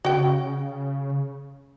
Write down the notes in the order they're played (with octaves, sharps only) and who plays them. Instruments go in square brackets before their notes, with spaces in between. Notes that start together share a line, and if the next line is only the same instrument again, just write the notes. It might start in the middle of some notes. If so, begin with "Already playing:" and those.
[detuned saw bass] C#3 [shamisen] F#4 G5